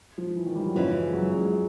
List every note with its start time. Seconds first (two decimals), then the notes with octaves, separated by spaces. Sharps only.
0.18 F3
0.36 E3
0.46 D#3
0.55 G3
0.65 F#3
0.75 F#2 C#3 E3 F3 G#3
1.13 F#3
1.33 G#3